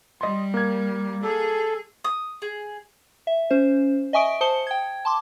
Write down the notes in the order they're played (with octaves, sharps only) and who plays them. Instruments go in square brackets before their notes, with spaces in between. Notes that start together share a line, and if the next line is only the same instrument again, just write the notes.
[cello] G3 [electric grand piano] D#5 C6
[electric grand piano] A#3 G#6
[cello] G#4 [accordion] A4
[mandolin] D#6
G#4
[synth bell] E5
C#4 C5
D#5 E5 G#5 C#6 D#6 D7
C5 A5 D#6 C#7 G7
G5 G#6
A5 C6 D6